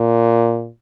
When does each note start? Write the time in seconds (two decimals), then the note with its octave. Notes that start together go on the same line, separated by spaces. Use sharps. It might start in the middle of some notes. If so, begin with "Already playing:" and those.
Already playing: A#2